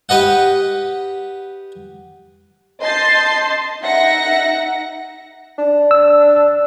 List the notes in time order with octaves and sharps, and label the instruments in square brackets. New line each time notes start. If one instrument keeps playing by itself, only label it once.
[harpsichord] G4 B4 D#5 F#5
[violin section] D#5 A5 C6 G6 A6 C7
D#4 E5 F#5 A#6 C#7
[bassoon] D4
[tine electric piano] E6